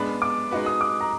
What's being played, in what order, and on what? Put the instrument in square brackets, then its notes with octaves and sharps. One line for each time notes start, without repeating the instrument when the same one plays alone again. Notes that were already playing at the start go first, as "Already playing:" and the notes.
Already playing: [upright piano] G#3 B3 D4 [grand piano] B5
[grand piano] D6
[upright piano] G#3 D#4 F#4 B4
[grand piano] D#6
D6
A#5